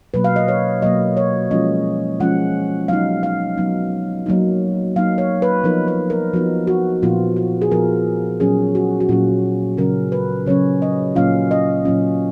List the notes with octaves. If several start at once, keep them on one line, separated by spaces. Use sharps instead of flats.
B2 F#3 A#3 B4
F5
D#5
C#5
B2 F#3 A#3 D#5
C#5
F3 G#3 C#4 F4 D#5
F3 G#3 C#4 F4 F#5
F#3 B3 D#4 F5
F5
F#3 B3 D#4
F#3 A#3 D#4
F#3 A#3 D#4 F5
C#5
B4
F3 B3 D#4 A#4
B4
A#4
F3 B3 D#4 F#4
F#4
A#2 F3 B3 F4
F#4
G#4
A#2 F3 B3 F4 A#4
A#2 F#3 C#4 G#4
F#4
F#4
A#2 F#3 C#4 F4
C#3 F#3 C#4 A#4
B4
C#3 F#3 C#4 C#5
D#5
A#2 F#3 A#3 C#4 F4 F5
D#5
A#2 F#3 A#3 C#4 F4